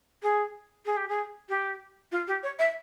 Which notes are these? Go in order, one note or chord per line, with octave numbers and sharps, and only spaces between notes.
G#4
G#4
G4
G#4
G4
F4
G4
C#5
E5